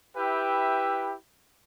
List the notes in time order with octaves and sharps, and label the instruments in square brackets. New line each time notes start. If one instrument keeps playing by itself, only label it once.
[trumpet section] E4 G4 B4 E5 G5